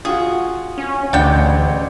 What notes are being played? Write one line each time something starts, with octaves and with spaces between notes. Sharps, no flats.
F4 F#4 G#4 F#5
C#4
A1 D2 C#3 D4 G5 C#7